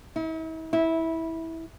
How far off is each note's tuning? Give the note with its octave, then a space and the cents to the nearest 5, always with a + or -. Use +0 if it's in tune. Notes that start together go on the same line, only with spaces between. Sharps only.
E4 -45
E4 -15